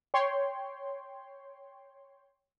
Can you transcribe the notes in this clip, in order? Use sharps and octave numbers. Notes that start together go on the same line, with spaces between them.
C#5 G5 C6